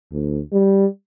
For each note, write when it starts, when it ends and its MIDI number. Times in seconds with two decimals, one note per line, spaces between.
0.12 0.39 38
0.52 0.86 55